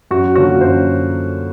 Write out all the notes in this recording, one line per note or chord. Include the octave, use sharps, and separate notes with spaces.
F#2 F#4
D3 F3 A#3 C#4 F#4
F#2 C5